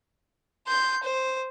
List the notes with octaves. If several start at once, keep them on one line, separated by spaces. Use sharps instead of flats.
C6 G6
C5